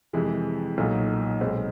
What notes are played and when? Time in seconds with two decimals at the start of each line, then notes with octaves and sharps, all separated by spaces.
0.13 F2 C3 E3 G#3
0.78 B1 A#2 F#3 A#3 D#4
1.41 B1 B2 G#3 C4